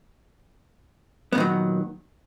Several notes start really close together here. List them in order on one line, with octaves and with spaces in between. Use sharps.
B3 A#2 D#3 F#3